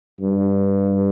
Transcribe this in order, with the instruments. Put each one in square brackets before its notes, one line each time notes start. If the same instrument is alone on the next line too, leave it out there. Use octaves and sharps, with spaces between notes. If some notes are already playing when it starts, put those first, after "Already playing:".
[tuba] G2